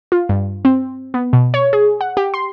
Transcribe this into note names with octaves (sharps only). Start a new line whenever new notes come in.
F4
G2
C4
B3
B2
C#5
G#4
F#5
G4
C6